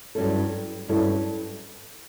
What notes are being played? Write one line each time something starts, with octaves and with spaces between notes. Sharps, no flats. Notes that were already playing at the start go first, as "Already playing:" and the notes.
G2 F#3 C#4 E4 A4
G2 F#3 C#4 E4 A4